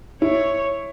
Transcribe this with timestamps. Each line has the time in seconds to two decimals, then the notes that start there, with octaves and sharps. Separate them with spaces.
0.22 E4 C#5